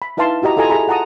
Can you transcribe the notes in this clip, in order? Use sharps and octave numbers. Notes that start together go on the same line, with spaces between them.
B5
D#4 E4 B4 F5 A5 C6
E4 F#4 G4 D#5 A#5
E4 F4 A4 D#5 G#5 A#5
G#4 E5 A#5 B5
F4 F#5 A5 A#5 D#6